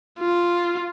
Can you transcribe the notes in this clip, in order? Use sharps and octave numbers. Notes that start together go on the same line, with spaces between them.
F4